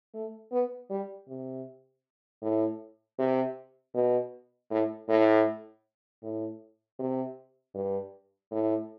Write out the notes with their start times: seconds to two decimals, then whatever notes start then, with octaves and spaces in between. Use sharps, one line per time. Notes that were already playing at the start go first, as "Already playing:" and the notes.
0.14 A3
0.52 B3
0.90 G3
1.28 C3
2.42 A2
3.19 C3
3.94 B2
4.71 A2
5.09 A2
6.23 A2
6.99 C3
7.75 G2
8.52 A2